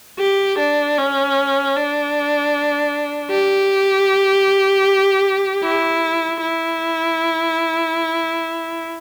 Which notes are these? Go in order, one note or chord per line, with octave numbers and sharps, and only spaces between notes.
G4
D4
C#4
D4
G4
E4
E4